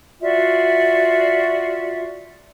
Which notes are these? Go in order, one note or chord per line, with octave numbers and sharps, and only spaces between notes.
F4 F#4 D5 E5